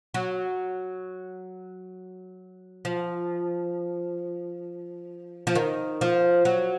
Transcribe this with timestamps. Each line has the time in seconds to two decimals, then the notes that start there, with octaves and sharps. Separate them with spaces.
0.14 F#3
2.85 F3
5.47 F3
5.55 D#3
6.01 F3
6.45 F#3